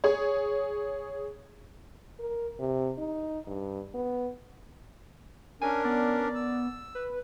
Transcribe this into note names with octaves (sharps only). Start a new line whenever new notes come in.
G#4 C#5
A#4
C3
D#4
G2
B3
C#4 D4 A#4 G#5
B3 D5
E6
B4